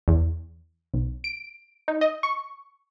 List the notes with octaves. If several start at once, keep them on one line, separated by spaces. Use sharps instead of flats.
E2
B1
D7
D#4
D#5
C#6